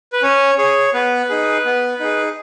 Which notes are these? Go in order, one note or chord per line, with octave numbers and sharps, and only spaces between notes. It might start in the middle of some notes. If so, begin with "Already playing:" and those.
B4
C#4 C#5
G#4 C#5
B3 B4
D#4 G#4
B3
D#4 G#4